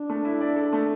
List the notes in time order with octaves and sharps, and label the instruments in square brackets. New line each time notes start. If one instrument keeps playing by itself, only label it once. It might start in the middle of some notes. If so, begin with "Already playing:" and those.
Already playing: [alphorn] D4
[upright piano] A3
E4
D5
A4
A3